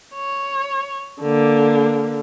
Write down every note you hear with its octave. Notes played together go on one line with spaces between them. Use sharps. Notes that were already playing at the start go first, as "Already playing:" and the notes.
C#5
D3 A#3